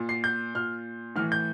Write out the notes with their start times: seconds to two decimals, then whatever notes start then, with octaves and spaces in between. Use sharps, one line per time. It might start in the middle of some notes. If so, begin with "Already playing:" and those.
Already playing: A#2
0.09 C7
0.24 G6
0.55 A#2 F6
1.16 A2 E3 F6
1.32 G6